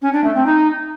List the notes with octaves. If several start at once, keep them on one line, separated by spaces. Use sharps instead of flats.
C#4
D4
A3
C4
D#4